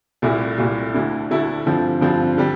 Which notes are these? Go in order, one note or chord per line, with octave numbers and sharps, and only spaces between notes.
C2 A#2 A3 E4
C2 A#2 A3 E4
D2 D3 A3 E4
D2 D3 A3 E4
G2 D3 F3 C4
G2 D3 F3 C4
D3 G3